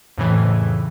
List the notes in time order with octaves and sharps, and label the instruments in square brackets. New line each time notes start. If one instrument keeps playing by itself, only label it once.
[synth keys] F2 A2 C#3 E3